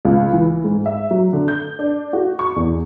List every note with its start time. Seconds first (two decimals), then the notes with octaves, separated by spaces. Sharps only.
0.05 C#2
0.33 E3
0.64 G#2
0.86 E5
1.11 F#3
1.33 D3
1.48 G6
1.79 D4
2.13 F#4
2.39 C#6
2.56 E2